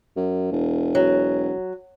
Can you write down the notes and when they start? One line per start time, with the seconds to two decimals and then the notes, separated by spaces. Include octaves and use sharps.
0.17 F#2
0.51 E1
0.95 F#3